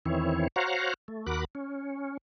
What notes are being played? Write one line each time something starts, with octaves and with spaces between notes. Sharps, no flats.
E2 D#3 E3 C4 E4 C#5
F#4 C5 C#5 F5 F#5 A#5
A3
D#2 F#4 A#4 B5 D6 F#6
C#4